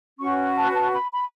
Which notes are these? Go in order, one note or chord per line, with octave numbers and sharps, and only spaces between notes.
C#4 F#4 B4 C#6
A5
A5
B5
B5